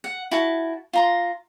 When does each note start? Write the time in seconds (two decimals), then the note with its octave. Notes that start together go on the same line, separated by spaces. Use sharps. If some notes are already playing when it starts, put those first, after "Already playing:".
0.04 F#5
0.31 E4 F#4 A5
0.93 F4 A#5 C6